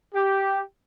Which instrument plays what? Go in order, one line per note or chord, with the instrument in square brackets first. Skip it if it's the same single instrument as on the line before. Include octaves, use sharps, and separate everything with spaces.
[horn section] G4